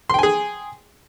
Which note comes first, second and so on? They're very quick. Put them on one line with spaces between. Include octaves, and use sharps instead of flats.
C6 G5 G#5 G#4